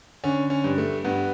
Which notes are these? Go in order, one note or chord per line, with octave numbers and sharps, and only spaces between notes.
D3 C#4
C#4
G2
A3
G2 B3